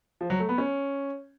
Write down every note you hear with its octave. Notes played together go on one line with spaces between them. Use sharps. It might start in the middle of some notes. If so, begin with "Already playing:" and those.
F3
F#3
A3
B3
C#4